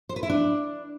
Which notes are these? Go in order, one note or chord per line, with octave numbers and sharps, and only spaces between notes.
C5
B4
E4
D4